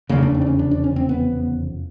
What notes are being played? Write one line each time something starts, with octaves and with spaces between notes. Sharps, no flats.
F1 E2 C#3 A#3
D4
C4
D4
C#4
D4
D4
C#4
C4
B3